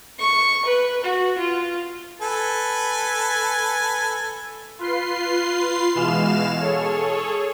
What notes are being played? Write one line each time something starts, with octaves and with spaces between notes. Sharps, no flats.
C#6
B4
F#4
F4
A4 B4 G#5
F4 B4 C6 C7
B2 E3 G#3 F5 F6 E7
G#4 A4 C#5